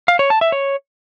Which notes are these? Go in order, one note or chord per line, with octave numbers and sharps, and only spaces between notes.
F5
C#5
A5
E5
C#5